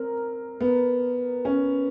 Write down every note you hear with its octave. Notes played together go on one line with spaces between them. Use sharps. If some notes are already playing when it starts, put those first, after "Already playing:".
Already playing: C4 A#4
B3
C#4